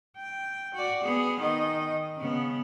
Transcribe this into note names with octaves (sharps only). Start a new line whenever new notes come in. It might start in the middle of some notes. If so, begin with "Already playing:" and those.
G5
F#4 D5
B3 G#4
D#3 D#5
C#3 B3